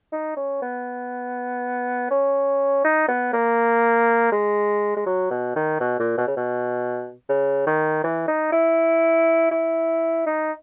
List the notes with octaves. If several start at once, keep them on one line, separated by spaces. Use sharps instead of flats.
D#4
C#4
B3
C#4
D#4
B3
A#3
G#3
G#3
F#3
B2
D#3
B2
A#2
B2
C#3
B2
C#3
D#3
E3
D#4
E4
E4
D#4